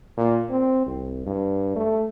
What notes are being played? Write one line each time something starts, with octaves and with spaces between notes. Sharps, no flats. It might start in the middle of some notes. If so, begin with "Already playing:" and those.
A#2
C4
C2
G2
A3